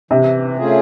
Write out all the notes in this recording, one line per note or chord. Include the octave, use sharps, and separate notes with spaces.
C3 E3
A3 C#4 F4 G#4